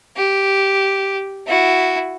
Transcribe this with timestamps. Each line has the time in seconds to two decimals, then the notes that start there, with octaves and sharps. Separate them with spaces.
0.17 G4
1.47 E4 F#4